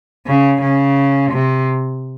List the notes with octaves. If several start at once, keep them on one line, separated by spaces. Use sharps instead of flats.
C#3
C#3
C3